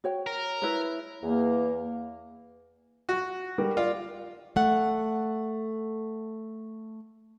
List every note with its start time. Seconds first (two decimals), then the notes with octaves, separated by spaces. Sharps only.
0.04 F#4 C#5 G5
0.26 A#4
0.62 E4 B4 C#5
1.23 E2 A#3
3.09 F#4
3.58 G3 A#4
3.77 F4 D5
4.56 A3 F#5